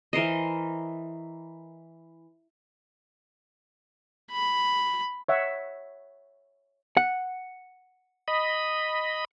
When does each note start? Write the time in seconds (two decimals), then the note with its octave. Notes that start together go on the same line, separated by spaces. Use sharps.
0.13 E3 A#4 C5 D#5
4.31 B5
5.29 C#5 E5 F#5
6.97 F#5
8.28 D#5 B5